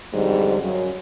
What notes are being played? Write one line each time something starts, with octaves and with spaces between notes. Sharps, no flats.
F2 G#2 D3 F#3 G3
F#2 C#3 F#3